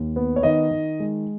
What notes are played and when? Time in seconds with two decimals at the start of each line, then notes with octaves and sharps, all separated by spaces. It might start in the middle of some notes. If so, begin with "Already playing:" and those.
Already playing: D#2
0.16 B3
0.36 C#5
0.43 D#3 D#5
0.71 D#3
1.00 G#3